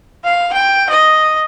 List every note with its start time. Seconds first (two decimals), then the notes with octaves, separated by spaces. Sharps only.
0.24 F5
0.53 G5
0.90 D#5